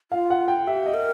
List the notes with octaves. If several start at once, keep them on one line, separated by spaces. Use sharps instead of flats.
F4 F5
F#5
G5
G4 E5
D#5
A#4